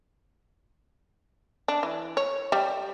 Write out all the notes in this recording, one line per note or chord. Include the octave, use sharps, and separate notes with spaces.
D4
E3
C#5
G3